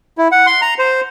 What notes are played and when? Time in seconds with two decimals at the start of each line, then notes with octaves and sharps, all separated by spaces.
0.18 E4
0.32 F#5
0.47 C6
0.62 A#5
0.79 C5